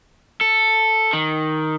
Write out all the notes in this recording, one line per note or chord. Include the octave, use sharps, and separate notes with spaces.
A4
D#3